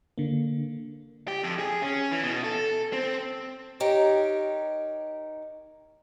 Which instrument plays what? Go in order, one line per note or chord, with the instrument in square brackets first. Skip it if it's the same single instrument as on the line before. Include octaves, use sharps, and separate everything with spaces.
[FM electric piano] D3 A#3
[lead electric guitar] G4
F2
G#4
C#4
E3
B2
A4
C4
[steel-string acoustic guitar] D#4 G4 A#4 C#5